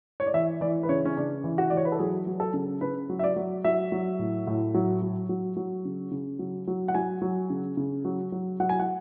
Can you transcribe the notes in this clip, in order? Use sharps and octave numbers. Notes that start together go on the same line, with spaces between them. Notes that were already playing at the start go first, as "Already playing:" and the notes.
C#5
D5
E3 E5
E3 D5
B4
C#3 C#5
C#4
C#3 D4
E3
F#4
E3 D5
C#5
B4
A4
F#3 G#4
F#3
A4
C#3
C#3 B4
F#3
E5
D5
F#3
F#3 E5
F#3
A2
A2
F#3
F#3
F#3
F#3
C#3
C#3
F#3
F#3
F#5
F#3 G#5
F#3
C#3
C#3
F#3
F#3
F#3 F#5
G#5
F#5